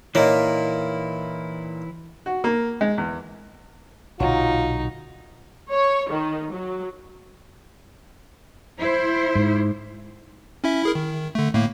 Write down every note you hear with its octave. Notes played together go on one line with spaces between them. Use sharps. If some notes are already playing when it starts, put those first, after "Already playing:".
A#2 E3 A#3 D#4 E4 C#5 D#5
F#4
A#3
G#3
E2
B1 A#2 D3 F#3 D#4 F4
C#5
D#3
F#3
E4 C5
G#2
C#4 E4 E5
E4 G#4 A#4
D#3
D3 A3
A2 A3 A#3